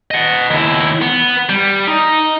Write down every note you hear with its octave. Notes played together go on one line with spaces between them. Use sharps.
D#5 F#5
D#2 E4
B3
G3
D#4